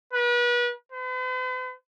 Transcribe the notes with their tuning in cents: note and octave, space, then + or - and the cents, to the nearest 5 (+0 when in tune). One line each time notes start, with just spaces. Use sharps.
B4 -35
B4 +45